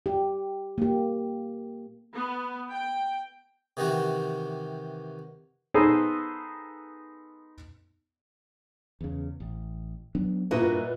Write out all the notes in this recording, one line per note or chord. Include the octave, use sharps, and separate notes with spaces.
G4
A#3 G4
B3
G5
C3 D#3 E3 F#4 G4
B3 D#4 G#4 A4 C5 D#5
E2 C#3
A1
F#3 B3 D4
G2 A#2 A#3 E4 F#4 B4 D#5